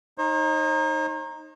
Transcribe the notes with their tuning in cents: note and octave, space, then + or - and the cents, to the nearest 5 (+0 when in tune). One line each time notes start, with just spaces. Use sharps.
D#4 +0 C5 +45